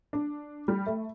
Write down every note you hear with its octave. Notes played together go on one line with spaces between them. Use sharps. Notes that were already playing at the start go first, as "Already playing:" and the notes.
D4
G3
A3